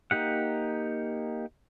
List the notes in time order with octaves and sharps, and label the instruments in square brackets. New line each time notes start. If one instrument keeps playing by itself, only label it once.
[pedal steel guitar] A#3 D#4 G4 F#5